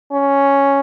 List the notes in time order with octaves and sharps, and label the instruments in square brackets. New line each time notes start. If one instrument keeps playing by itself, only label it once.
[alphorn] C#4